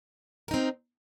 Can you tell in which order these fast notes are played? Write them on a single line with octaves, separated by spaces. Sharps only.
A#4 D#4 C4